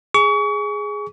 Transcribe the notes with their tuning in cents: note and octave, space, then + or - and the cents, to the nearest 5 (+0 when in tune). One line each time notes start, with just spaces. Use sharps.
G#4 +0 C#6 +35